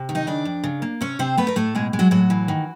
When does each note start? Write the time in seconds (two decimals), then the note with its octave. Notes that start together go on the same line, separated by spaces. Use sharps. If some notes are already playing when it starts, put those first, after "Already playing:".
Already playing: C3
0.09 D#3
0.15 D#4 D#5
0.27 C#3 D4 D5
0.45 F2
0.64 C#3
0.82 A#3
1.01 C3 C#4 C#5
1.19 C3 C4 C5
1.37 A3 B3 B4
1.48 A#4
1.56 A2 A3 A4
1.75 B2 G#3 G#4
1.93 G#3
1.99 F#3 F#4
2.11 A2 F#3 F#4
2.30 E3
2.48 D#3